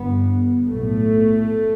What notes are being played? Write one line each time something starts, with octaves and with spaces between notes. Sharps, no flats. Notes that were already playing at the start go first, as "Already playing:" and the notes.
Already playing: G1 G2 B3
B1 A2 A3